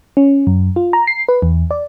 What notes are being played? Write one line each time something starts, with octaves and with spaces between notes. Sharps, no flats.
C#4
F#2
F4
A#5
C7
B4
E2
D5